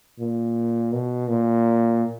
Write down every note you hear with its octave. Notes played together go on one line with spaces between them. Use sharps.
A#2
B2
A#2